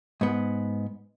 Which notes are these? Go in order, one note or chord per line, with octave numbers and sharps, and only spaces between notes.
G#2 B3